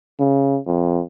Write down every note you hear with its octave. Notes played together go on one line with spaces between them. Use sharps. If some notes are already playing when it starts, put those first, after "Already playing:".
C#3
F2